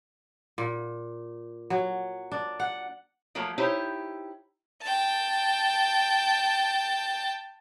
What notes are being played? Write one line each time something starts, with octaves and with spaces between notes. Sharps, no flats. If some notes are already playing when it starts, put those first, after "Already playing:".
A#2
F#3
D4
F#5
F3 F#3 A3 A#3
D#4 E4 G4 C5 C#5
G5 A5